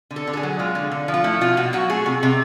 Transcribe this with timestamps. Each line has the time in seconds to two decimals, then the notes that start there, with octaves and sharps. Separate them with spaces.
0.11 D3
0.16 A4
0.27 D3
0.33 A4
0.37 G#4
0.43 F#3
0.59 G#3 F4
0.75 D3
0.91 D3
1.08 F3
1.14 F4
1.24 A3 E4
1.41 B2 F4
1.57 B2 F#4
1.73 F#3 F#4
1.89 A3 G#4
2.06 C3
2.23 C3